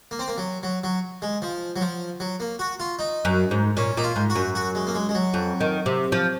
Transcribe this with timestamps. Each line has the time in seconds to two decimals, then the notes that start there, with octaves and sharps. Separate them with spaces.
0.11 A#3
0.19 C4
0.28 A#3
0.38 F#3
0.63 F#3
0.84 F#3
1.22 G#3
1.42 F3
1.76 F#3
1.81 F3
2.20 F#3
2.40 A#3
2.59 F#4
2.80 F4
2.99 D#4
3.25 F#2
3.51 G#2
3.77 A#2 C#4
3.97 A#2 D#4
4.04 F4
4.16 G#2
4.30 F#4
4.35 F#2
4.55 F#4
4.75 G#3
4.87 A#3
4.95 G#3
5.09 G#3
5.15 F#3
5.34 F2
5.61 D#3
5.86 C3
6.12 F3